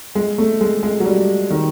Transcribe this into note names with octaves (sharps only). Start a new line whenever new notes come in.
G#3
A3
G#3
G#3
F#3
G3
D#3